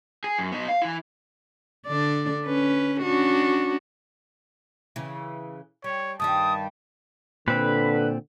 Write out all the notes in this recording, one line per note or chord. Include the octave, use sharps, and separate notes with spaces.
G#4
F#2
B3 D#4
F5
E3 E4
D3 D4 D5
C#4 B4
C#4 D4 F#4
C#3 E3
G3 C#5
G2 D#3 G3 A5 D#6
A#2 D3 C4 B4